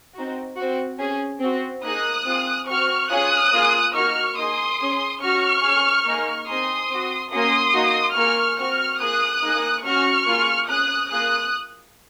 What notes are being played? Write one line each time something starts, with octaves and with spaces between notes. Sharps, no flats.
C4 D#4 F#4
C4 F#4
C#4 G#4
C4 F#4
A#3 D#4 G#4 D#6 F#6
C4 F4 G#4
C4 F#4 C#6 F6
C#4 F4 G#4 D#6 F#6
A#3 F4 G#4
A#3 D#4 F#4 C#6 F6
A#3 D#4 G#4 C6 D#6
C#4 G#4
C#4 F#4 C#6 F6
C#4 G#4
A#3 D#4 G#4
C4 D#4 G#4 C6 D#6
C4 F#4
A#3 C#4 F#4 C6 D#6
A#3 D#4 F#4
A#3 F4 G#4 C#6 F6
C4 F#4 C#6 F6
A#3 F4 G#4 D#6 F#6
A#3 D#4 G#4
C#4 F#4 C#6 F6
A#3 F4 G#4
C#4 G#4 D#6 F#6
A#3 F4 G#4 D#6 F#6